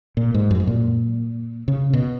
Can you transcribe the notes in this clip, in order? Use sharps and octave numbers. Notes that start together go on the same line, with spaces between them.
A#2
G#2
F#2
G#2
A#2
C#3
B2